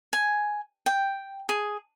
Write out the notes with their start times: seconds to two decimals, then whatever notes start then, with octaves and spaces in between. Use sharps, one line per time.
0.13 G#5
0.86 G5
1.49 G#4